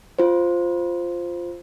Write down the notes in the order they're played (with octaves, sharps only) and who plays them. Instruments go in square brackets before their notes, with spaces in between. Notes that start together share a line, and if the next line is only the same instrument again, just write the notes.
[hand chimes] F4 C5